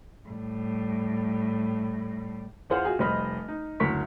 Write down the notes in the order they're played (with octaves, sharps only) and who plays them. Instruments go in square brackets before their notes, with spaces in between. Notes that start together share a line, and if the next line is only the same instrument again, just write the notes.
[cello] A2 G3
[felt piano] E2 F4 G#4 C5 F#5 F6
F4 F#4 G#4
F1 G3 C5 D#5 B5 F6
D#4
F#1 D2 A#4 C#6 B6